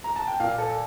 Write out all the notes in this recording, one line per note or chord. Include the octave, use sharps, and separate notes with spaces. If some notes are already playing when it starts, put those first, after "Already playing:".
A#5
A5
G5
A#2 F5
A4